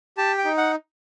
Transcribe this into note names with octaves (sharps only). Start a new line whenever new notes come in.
G4 A5
G5
D#4
F#5